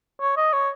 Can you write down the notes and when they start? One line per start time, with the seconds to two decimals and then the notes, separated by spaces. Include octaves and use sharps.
0.21 C#5
0.37 D#5
0.53 C#5